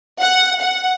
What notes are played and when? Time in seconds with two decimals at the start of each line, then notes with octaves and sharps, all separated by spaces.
0.21 F#5
0.61 F#5